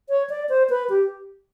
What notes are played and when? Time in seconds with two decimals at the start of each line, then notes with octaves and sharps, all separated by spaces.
0.09 C#5
0.30 D5
0.49 C5
0.70 B4
0.90 G4